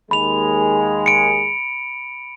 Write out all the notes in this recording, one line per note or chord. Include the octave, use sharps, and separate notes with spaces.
D#2 G#3 B5 F7
C#7 D7